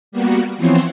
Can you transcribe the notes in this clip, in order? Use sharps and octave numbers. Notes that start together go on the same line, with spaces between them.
G3 A#3 B3 F#4
E3 F3 B3 C4 C5 C#5